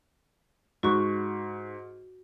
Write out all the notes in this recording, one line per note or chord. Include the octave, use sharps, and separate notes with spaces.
G#2 F#4 C#6